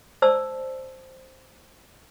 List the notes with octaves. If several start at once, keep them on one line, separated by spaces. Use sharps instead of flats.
C5 D5 A5 E6